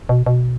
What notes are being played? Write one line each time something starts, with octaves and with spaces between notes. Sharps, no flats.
B2
B2